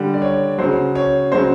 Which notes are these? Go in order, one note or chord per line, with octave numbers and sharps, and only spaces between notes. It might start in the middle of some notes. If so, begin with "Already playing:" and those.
Already playing: D3 G3
D5
C#5
C#3 F#3 C5
C#5
C#3 F#3 C5